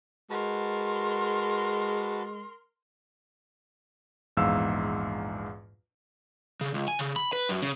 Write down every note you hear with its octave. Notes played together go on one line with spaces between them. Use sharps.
G#3 F#4 A#4 B4 A5 C6
A#1 E2 G#2 F5 E6
C#3
C#2
G#5
C#3
B5
B4
F#2
C#3